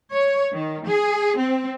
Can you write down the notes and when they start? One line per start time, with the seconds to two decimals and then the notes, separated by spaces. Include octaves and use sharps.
0.12 C#5
0.52 D#3
0.87 G#4
1.38 C4